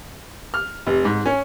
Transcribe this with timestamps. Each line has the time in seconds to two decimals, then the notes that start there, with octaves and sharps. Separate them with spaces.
0.54 F6
0.87 F1
1.05 G#2
1.26 C#4